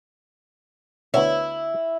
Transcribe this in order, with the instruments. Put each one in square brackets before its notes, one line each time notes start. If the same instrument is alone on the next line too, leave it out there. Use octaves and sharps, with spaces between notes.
[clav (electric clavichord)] D2 B3 C#5 [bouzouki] E4